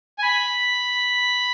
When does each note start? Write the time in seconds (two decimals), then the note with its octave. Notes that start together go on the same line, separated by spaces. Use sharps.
0.18 G#5
0.23 B5